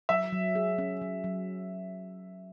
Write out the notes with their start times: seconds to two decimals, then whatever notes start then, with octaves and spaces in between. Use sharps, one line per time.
0.09 F#3 E5
0.32 F#3
0.55 G#4
0.78 C#4
1.02 F#3
1.24 F#3